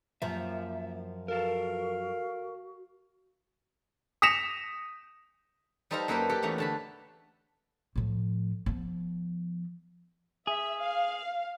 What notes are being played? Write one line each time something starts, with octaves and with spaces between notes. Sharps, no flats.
F#2 F3 A#3 E5
F#4 A4 A#4 F5
D#6 A#6 B6 C#7 E7 F7
G3 D#4 A4 C5 F5 A#5
F#2 A#3 A4 B4 C5 G5
G4 A4 F#5 G5
E2 A3 C#4 A#5
D3 A5 B5
A2 F3
F3 B3
G#4 E5
F5